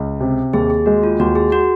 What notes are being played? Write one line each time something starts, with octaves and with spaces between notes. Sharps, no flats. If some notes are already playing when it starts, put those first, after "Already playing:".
Already playing: C#2
C3
D#2 G#4
G#4
G#3 F#4
F4
D#2 F#4
G#4
F#4